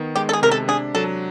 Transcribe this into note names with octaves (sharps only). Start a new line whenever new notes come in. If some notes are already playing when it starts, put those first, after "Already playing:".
Already playing: D#3 B3
G#3 G4
A4
G#4
C3 A#4
A4
D4 G#4
F#3 A4